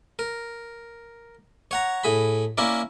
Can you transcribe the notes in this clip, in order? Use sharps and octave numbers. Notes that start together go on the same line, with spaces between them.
A#4
C#5 F#5 A#5
A2 G#4 B5
A#3 C#4 E4 A#4 D5